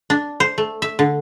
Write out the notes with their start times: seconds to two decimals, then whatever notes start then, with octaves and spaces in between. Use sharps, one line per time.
0.10 D4
0.40 C5
0.58 A3
0.82 E5
0.99 D3